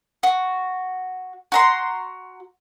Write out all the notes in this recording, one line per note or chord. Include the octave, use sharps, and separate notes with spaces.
F#4
F#4 A#5 C6